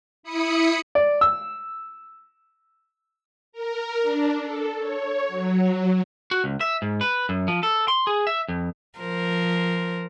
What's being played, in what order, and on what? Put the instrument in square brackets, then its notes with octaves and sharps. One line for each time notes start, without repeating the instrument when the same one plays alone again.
[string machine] E4 B5 D#6 C#7
[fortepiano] D5
E6
[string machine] A#4
D4
A4
C#5
F#3
[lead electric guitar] F#4
C#2
E5
G#2
B4
F#2
F3
A4
C6
G#4
E5
F2
[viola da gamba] F3 A#4 C5